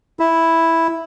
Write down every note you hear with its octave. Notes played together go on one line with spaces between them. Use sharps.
E4